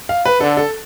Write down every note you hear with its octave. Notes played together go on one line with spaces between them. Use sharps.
F5
B4
D3 A4
A4